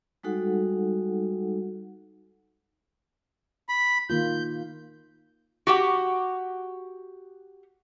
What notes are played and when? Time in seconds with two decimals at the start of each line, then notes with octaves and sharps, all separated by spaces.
0.23 G3 G#3 D#4 F#4 A4 F#5
3.69 B5
4.10 D#3 A#3 F4 G6
5.67 F#4 G4 F#5